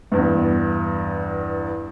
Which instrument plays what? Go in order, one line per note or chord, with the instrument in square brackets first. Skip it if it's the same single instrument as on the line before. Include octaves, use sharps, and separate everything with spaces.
[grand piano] E2 G2